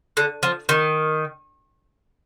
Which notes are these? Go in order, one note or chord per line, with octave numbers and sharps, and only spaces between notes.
D3
F3
D#3